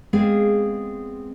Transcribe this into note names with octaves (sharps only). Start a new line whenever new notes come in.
G#3 B3 C4 G#4 D5 F5